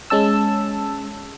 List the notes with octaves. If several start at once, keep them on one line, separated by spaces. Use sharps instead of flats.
G#3 C#4 A5 E6